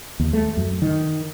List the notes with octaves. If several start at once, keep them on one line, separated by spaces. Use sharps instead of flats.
D#2
A3
F#2
D#3